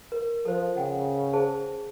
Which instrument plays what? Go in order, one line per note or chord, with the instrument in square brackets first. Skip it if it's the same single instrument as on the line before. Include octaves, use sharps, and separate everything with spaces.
[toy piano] A#4
[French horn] F3 [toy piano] A4 C5
[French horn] C#3 [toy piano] F#5 G5
[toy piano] G#4 C5 A5